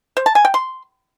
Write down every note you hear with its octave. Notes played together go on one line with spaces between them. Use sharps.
C5
A5
G#5
G5
C6